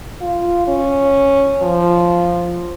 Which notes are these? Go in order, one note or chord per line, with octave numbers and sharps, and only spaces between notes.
F4
C#4
F3